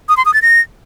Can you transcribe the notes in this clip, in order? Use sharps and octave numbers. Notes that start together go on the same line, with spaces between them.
D#6
C6
D#6
A6
A#6